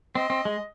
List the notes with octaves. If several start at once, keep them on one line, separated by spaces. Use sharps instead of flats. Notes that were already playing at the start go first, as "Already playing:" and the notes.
C4 D#5
C4
G#3